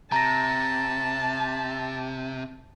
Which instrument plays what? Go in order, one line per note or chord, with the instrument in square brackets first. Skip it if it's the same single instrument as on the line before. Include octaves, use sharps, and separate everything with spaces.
[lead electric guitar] C3 [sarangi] A5 [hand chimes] A#5 A#6